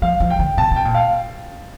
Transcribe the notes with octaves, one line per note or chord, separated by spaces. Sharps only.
F3 F5
F3
G5
D3
C3 A5
C3 G5
A#2
F5